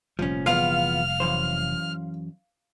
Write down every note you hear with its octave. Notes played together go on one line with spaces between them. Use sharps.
F1 A#2 F3 G3 C#4
E2 B3 F4 F5 F6
F#2 E3 C5